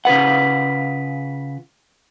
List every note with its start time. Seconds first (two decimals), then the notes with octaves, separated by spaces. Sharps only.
0.05 C#3 F4 B4 F#5